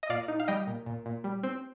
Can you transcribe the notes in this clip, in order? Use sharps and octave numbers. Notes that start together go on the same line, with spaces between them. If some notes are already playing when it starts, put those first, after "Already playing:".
D#5
A#2 D5 F5
D#4
F5
G3 D#5 G5
A#2
A#2
A#2
G3
C4